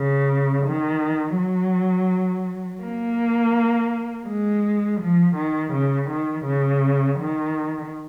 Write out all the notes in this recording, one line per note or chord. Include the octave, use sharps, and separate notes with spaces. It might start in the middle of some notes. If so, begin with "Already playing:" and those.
Already playing: C#3
D#3
F#3
A#3
G#3
F3
D#3
C#3
D#3
C#3
D#3